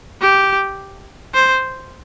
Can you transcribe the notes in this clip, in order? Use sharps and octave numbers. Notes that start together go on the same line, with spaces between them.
G4
C5